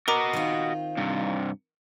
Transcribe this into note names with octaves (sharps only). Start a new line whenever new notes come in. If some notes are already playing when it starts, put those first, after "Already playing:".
F#4 A#4 D#5 A#5 D6
D#3 C4 F4
G2 C3